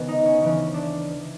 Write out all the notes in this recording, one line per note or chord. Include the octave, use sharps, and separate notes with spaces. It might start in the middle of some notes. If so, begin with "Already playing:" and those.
Already playing: C#2 C3 D#3 B3
D#4
C#4
D2 C#3 E3 C#4
D4